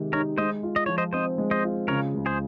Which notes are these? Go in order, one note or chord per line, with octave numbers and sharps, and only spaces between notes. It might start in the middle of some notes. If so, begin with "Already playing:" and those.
Already playing: C3 D#3 G#3
D#4 A#4 C#5
G#3 C5 D#5
F4
D#5
F3 C#5
C5 D#5
C4 C5 D#5
G#3
C5 D#5
F4
C#3 A#4 C#5
C#2
G#4 C5